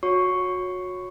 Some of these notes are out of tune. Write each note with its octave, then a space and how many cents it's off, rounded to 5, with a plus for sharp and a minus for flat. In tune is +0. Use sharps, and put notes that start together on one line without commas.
F#4 -25 C#5 +0 C#6 +0